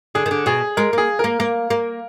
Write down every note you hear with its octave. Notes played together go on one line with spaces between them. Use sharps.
D3 G#4
D#3
D3
B2 G#4
G#3 A#4
A#3 G#4
A#3 A#4
A#3 A#4
A#3